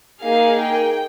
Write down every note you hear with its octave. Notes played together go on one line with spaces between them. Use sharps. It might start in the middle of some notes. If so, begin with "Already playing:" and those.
A#3 D#4 G#4 F5
G5